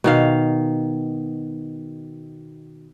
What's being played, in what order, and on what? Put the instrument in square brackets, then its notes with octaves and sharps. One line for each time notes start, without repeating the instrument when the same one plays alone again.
[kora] B2 D#3 F5